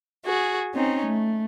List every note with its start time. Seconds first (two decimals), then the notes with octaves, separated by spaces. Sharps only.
0.25 F#4 G#4
0.73 C4 C#4 D#4
1.04 A3